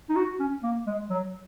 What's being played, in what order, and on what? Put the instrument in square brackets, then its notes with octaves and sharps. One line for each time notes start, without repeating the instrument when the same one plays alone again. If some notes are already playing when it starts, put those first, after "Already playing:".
[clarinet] D#4
F#4
C#4
A#3
G#3
F#3